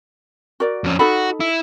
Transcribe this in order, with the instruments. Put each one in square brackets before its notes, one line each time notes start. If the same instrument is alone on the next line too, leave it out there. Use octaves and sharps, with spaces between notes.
[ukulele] F#4 A#4 D5
[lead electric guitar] F2 C#4
[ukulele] D#4 A4 B5 [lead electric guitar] F#4
[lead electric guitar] E4